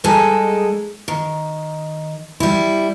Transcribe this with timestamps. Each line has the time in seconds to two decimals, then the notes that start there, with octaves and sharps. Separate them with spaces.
0.04 G3 G#3 D#4 G#4 A4
1.08 D#3
2.40 G3 E4